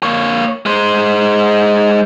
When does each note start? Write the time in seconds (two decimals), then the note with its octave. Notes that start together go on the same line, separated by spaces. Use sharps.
0.03 A#3 C#5
0.66 G#3 C5